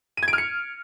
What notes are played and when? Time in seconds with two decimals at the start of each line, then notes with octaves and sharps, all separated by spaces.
0.17 D#7
0.23 G#6
0.28 D7
0.33 F6
0.38 C#7